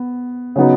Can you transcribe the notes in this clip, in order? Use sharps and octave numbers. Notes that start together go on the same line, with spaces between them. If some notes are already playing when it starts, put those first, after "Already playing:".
Already playing: B3
C#3 F#3 B3 D#4